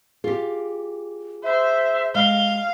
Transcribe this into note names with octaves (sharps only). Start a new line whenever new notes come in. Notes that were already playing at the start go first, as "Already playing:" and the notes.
F4 G4 G#4
C5 E5
G#3 F5 G7